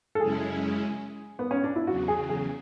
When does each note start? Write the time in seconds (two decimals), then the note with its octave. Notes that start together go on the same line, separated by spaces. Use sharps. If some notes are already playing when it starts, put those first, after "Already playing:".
0.15 A4
0.20 F#2 C#3 G#3 C#4 E4 G#4
1.39 B3
1.51 C#4
1.64 D4
1.76 E4
1.87 E2 C#3 F#3 F#4
2.08 G#4
2.29 G#4